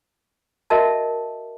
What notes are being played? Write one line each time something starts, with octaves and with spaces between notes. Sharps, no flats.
F#4 A#4 D#5 E5 A5